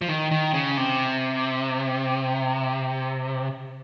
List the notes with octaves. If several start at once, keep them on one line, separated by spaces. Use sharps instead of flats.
F3
D#3
D#3
C#3
C3